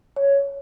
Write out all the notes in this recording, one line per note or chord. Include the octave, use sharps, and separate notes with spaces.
C#5